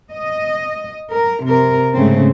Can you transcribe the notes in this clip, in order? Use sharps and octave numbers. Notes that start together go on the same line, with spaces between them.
D#5
A#4
C3 A#4
G#2 C#3 A3 C4